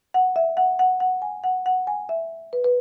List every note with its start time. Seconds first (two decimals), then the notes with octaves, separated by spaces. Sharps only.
0.14 F#5
0.36 E5
0.57 F#5
0.79 F#5
1.00 F#5
1.22 G#5
1.44 F#5
1.66 F#5
1.87 G#5
2.09 E5
2.53 B4
2.64 B4